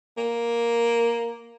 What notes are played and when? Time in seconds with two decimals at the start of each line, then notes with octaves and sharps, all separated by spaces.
0.17 A#3